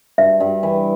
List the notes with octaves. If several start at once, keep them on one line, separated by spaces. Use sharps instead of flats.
G2 E5
G2
E3